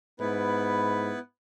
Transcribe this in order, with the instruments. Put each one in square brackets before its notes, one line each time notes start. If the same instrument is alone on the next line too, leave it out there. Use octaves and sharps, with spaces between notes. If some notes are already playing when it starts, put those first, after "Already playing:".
[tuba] G#2 [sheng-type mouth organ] B3 E4 B4